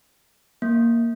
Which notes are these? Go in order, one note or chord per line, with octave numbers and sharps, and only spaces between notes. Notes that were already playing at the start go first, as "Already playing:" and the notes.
A#3